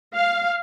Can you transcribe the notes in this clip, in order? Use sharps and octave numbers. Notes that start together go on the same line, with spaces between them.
F5